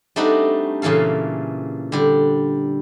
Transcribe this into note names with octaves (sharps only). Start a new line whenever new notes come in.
G3 A3 C4 D4 D#4 F#4
A#2 C#3 E3 A4 F5
D3 G3